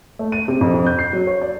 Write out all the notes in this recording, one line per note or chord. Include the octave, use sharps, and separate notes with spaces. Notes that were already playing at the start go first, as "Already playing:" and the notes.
A3
D#7
C3
F2
F2
G6
C7
F#3
C#5
D5